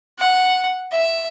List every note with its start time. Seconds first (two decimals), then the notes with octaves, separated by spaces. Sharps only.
0.19 F#5
0.92 E5